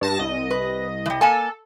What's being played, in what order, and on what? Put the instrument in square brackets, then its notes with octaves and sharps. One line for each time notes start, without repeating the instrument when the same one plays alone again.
[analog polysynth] G2 A5 A#6
C2 D#5
[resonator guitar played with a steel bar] B4
E3 G3
[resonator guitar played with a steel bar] A#3 G#5 A5 [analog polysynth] A4